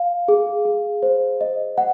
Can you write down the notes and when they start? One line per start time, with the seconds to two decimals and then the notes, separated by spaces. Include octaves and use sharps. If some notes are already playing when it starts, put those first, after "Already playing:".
Already playing: F5
0.28 G#4
0.65 G#4
1.03 C5
1.41 D#5
1.78 F#5